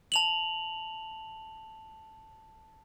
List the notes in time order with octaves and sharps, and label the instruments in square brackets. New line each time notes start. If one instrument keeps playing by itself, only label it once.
[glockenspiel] A5 F7 F#7